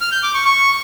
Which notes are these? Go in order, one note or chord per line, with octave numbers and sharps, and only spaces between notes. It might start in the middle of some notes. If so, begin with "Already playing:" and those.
F6
G6
D6
C#6
C#6